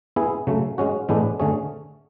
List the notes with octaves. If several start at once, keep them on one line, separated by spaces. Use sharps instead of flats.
B3 E4 G#4
C#3 F#3 A3
G#3 C#4 F#4
A2 E3 G#3 B3 D4
D3 A3 C#4 G#4 C#5